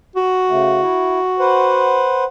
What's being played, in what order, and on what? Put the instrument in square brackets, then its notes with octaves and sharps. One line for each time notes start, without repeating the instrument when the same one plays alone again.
[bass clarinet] F#4
[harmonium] C#3 A3
E4
B4 C5 F#5